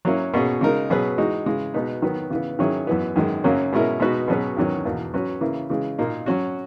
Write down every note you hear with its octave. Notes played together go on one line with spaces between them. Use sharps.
F#3 A#3 C#4 E4
B2 A#3 C#4 G#4
C#3 G#3 D#4 A#4
B2 F#3 C#4 G#4 B4
E3 G#3 D#4 F#4
C#3 E3 G#3
B2 G#3 B3 D#4
D#3 F#3 B3
C#3 E3 B3
D#3 F#3 C#4 E4 G#4
F#2 E3 B3
F#2 D#3 G#3
F#2 C#3 F#3 A#3 C#4
B2 G#3 C#4 E4 A#4
B2 G#3 D#4 F#4 B4
B2 F#3 C#4 G#4 B4
E2 D#3 F#3 C#4
E2 B2 A#3
F#3 C#4 F#4 B4
C#3 E3 A#3 E4
C#3 E3 G#3
A#2 A#3 D#4
F#3 C#4 F#4